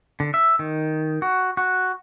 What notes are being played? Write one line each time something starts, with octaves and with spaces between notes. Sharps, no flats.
D3
E5
D#3
F#4
F#4